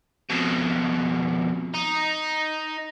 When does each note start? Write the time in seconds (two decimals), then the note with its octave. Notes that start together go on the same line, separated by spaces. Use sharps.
0.30 F2 B2
1.74 D#4